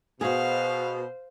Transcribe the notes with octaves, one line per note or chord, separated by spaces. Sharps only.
B2 F#4 G#4 C5 F5